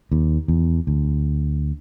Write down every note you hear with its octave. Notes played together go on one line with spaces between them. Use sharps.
D#2
E2
D2